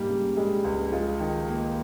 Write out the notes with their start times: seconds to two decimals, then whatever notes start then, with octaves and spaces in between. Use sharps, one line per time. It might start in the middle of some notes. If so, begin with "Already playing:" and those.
Already playing: G#2 G3 A#3
0.08 C#3
0.37 G3 G#3
0.64 C#2
0.92 G#3 F4
1.20 D#3
1.48 A#3